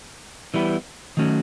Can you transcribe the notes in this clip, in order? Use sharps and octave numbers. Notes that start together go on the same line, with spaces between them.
E3 G3 B3 E4
D#3 F#3 A3 C#4